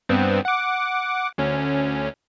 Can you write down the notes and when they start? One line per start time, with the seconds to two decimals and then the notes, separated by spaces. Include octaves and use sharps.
0.09 G2 B3 C4
0.45 F#5 D6
1.38 D2 C#4